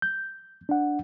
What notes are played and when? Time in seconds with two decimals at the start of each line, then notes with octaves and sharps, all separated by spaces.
0.02 G6
0.69 D4 F#5